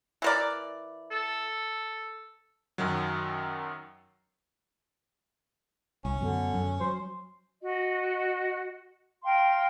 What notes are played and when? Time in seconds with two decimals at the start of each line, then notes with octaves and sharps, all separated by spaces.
0.22 E3 A#4 D5
1.11 A4
2.78 F#2 D#3 F#3
6.05 C2 C#4
6.21 F#2 B2 D3
6.54 F#2
6.81 F#3 C5
7.62 F#4 D#5
9.24 F5 G5 A#5 C6